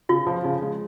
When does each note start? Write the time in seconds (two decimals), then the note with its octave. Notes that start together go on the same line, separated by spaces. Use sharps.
0.09 C#3 F4
0.27 F3
0.44 C#3
0.62 G#3